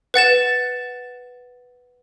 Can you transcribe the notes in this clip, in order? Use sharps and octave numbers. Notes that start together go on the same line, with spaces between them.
B4 F#5 A6 E7